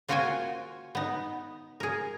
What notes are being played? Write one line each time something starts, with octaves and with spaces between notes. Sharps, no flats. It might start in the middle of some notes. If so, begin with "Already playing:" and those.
A#3 F4 F#4 C5 G5 G#5
B3 D#4
G#4 A#4